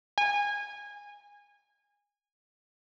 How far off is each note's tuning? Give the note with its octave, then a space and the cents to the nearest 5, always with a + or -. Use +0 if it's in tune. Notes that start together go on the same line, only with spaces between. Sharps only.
G#5 -20